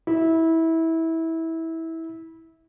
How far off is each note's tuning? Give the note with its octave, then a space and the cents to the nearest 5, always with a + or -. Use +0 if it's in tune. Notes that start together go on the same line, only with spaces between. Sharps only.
E4 -20